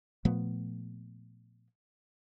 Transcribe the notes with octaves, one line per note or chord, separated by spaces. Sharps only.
A#2 F3 A3 B3